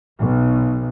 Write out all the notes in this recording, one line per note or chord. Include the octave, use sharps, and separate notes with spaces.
B1